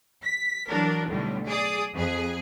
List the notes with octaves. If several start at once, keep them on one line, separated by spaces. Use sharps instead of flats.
B6
E3 F#3 D4 A#4
B1 A2 D3 G3
G#4 D5 D#6
F2 G#4